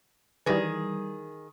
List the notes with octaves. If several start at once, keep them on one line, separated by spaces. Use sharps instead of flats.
D#3 E3 G3 G#4